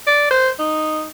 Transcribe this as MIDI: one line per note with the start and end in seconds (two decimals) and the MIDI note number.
0.07 0.30 74
0.31 0.49 72
0.59 1.06 63